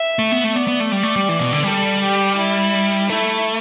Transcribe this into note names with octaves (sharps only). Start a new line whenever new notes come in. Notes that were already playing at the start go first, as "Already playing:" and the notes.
Already playing: E5
A3
B3
A3
B3 D5
B3
A3
G3 D5
A3
G3
E3
B2
D3
G3 A4
G4
E4
A3 E4